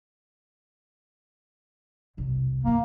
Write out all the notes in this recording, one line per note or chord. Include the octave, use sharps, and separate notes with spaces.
E1 C2
D3 E3 A#3